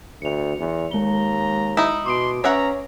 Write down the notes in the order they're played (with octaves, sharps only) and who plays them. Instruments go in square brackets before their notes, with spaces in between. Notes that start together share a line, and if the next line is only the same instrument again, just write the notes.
[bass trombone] D2 [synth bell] C#7 F7
[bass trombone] E2
[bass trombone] D#2 [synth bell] G#3 G7 [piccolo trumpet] A#5
[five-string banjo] D#4 E4
[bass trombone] B2 [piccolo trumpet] C6 [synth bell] D6 D#6 D7
[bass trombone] C#4 [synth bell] B4 [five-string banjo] C#5 E5 F#5 [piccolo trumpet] A#5